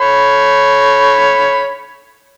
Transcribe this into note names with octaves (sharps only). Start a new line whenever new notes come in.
C#5 B5